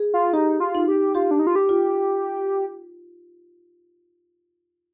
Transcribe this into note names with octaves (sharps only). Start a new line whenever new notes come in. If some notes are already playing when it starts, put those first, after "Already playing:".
Already playing: G#4
F4
D#4 G4
F4
D#4
G4
F4 G4
D4
D#4
F4
G4
F4